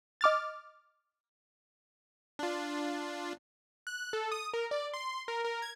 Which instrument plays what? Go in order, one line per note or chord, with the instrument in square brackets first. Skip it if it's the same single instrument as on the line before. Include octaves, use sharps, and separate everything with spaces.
[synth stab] D#5 D6 F6 A6
[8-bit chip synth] D4 F4
[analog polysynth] F#6
A4
D#6
A#4
D5
C6
A#4
A#4
G#6